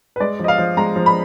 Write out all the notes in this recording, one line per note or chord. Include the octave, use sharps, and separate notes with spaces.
B4
G#3 D5
F3 D#5
F5
F3
G#3 A#5
F3
B5